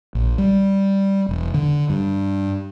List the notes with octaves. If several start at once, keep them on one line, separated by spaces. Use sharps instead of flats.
A#1
G3
E1
D3
G2